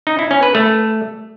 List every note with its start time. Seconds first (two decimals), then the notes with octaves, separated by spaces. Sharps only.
0.07 D#4
0.19 E4
0.31 C#4
0.43 B4
0.55 A3